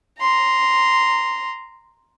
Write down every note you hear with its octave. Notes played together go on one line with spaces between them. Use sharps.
A#5 C6